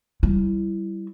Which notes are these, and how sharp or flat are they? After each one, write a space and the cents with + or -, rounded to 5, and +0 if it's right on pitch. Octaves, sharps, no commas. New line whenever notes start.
G3 -25 E4 +10